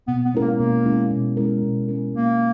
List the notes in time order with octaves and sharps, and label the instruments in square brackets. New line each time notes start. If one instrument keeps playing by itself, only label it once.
[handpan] B2 [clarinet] B3
[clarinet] B3
[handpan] G#3 C#4 E4 A#4
[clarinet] A#3
[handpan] B2 [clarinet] A#3
[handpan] G#3 C#4 E4 A#4
B2
G#3 C#4 E4 A#4
B2
G#3 C#4 E4 A#4
[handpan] B2 [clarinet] A#3